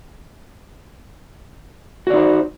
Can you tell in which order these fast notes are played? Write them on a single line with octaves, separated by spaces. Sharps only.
F#4 D5 D#4 C5